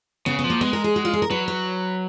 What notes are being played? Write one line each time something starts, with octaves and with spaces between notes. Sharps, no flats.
C#3 B3
B3
F3
A#3
G#3 B3
A#4
G#4
F#4
F4
G#4
A#4
F#3 B4
B4